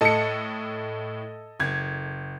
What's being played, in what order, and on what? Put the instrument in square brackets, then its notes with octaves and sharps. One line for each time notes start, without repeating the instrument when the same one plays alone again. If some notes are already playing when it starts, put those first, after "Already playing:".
[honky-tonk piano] A2 C#7 [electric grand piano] A4 D#5 A5
[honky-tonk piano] F#1 G#6